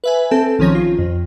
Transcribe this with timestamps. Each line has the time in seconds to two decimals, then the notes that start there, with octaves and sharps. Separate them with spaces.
0.04 B4 E5 G#5
0.31 C4 A4 A5
0.59 A#1 D#3 F3 C#4 C#5 A#6
0.75 F4
0.98 F2